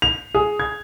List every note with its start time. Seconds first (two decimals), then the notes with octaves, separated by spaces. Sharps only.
0.02 F7
0.35 G#4
0.60 G#6